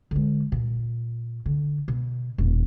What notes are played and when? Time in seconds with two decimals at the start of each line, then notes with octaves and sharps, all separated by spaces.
0.11 D3 G#3
0.52 A#2
1.46 D3
1.88 B2
2.38 E1 A#2